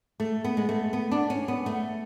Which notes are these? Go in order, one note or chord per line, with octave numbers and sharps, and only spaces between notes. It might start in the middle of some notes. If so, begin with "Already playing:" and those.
A3
B3
G#3
A3
B3
D4
C#4
B3
A3